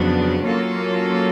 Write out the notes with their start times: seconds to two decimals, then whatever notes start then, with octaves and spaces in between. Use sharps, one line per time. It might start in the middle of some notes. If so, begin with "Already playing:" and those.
Already playing: F2 C#3 F#3 B3 D4
0.43 F#3 A#3 C#4 F4 A4